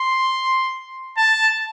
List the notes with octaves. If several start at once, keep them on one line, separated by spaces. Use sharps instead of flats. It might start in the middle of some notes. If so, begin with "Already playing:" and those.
Already playing: C6
A5